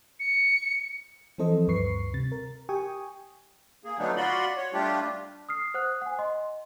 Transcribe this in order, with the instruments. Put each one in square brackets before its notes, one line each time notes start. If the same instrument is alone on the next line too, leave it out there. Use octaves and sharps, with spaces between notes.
[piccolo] C#7
[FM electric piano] E3 F3 C4 A4 C5 D#5
D2 G2 B4 C#6 C7
C3 A6
A#4
G4 G5 G#5 C#6 D#6
[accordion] A#3 G#4
D3 F#3 A3 B3 D4 D#4
F4 F#4 D5 B5 C6
C#5
G3 A3 D4 F4 G4
[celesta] D#6 F6 C7
C5 F#5 D#6 F#6
F#5 G#5
D#5 C6